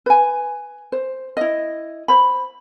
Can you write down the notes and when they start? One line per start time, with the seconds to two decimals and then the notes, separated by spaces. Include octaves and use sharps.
0.06 B4 G#5
0.92 C5
1.37 E4 D#5
2.08 C5 B5